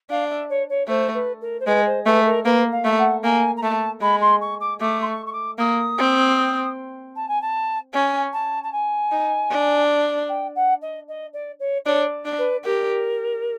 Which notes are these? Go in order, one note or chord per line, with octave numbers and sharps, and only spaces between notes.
D4 F5
E5
C#5
C#5
A3 C5
B4
A#4
C5
G#3 B4
C5
A3 B4
A#4
A#3 B4
F5
A3
F#5
A#3 G#5
A#5
A3 A5
G#3 B5
C6
C#6
D6
A3 D6
C6
C#6
C#6
D6
A#3 D#6
C4
A5
G#5
A5
C#4 G#5
A5
A5
G#5
D#4
D4
G5
F#5
D#5
D#5
D5
C#5
D4 C#5
D4
B4
G4 A#4